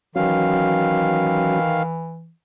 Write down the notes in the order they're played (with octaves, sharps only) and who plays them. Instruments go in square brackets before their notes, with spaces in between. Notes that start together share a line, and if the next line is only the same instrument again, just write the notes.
[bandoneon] D#3 F5 [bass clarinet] E3 [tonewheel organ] F#3 C#4 F#4